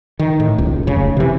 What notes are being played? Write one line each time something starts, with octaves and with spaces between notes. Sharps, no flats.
D#3
A2
D#1 C#2
F1 C#3
C3 E3